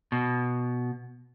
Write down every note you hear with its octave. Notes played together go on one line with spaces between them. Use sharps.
B2